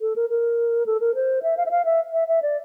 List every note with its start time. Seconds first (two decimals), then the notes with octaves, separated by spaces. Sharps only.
0.01 A4
0.16 A#4
0.30 A#4
0.86 A4
1.00 A#4
1.15 C5
1.43 E5
1.57 F5
1.66 E5
1.71 F5
1.85 E5
2.13 E5
2.28 E5
2.42 D5